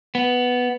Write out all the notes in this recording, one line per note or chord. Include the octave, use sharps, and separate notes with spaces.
B3